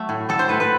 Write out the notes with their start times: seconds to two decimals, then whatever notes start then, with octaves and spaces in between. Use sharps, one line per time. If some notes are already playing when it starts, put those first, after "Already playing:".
Already playing: F#3 A3
0.09 A2
0.29 F#3 A4
0.39 C5
0.49 A2 B4
0.60 B4